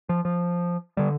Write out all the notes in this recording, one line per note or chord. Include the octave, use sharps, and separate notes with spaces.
F3
F3
D3 G3